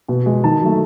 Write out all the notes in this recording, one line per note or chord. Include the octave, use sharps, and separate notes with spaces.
B2
G#3
D#3 A5
F#3 A3